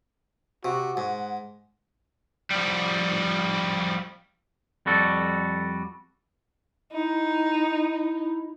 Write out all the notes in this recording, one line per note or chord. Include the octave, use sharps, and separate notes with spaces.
C3 F#4
G#2 F#5
F3 G3
F2 G3 F#4 A4
D#4 E4